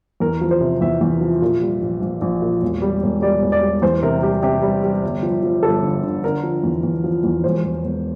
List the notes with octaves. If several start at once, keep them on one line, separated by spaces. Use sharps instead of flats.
E2 A#4
F3
C5
C3
E2 E5
E2
F3
A#2
G3
A#1
A#1
A#1
A#2
E1
G3
E1
G3 D5
E1
D5
G3
E2 C5
C3 A#4
G3 G4
C3 G4
G3
G3
G1
F3
F3
G1 A4
D3
D3
D3 A#4
F3
E2
E2
F3
E2
E1 C5
E1
E1